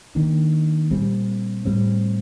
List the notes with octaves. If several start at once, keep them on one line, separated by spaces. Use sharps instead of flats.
D#3 A#3 D4
A#2 G3 C4
A2 G3 C4